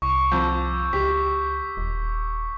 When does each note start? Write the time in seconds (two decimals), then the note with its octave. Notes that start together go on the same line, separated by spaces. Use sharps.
0.02 C2 C#6 D6
0.32 F2 E6 G6
0.93 C#2 G4 B6
1.77 D#1